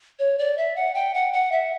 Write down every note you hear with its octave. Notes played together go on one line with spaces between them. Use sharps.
C#5
D5
E5
F#5
G5
F#5
F#5
E5